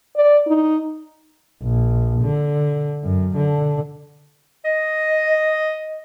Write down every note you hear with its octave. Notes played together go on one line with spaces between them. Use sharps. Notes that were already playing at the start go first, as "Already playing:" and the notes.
D5
D#4
A#1
D3
F#2
D3
D#5